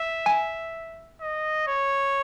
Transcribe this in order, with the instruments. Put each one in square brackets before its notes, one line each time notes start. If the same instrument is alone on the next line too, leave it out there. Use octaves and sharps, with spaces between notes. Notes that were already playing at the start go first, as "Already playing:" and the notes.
Already playing: [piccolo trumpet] E5
[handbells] G#5
[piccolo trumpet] D#5
C#5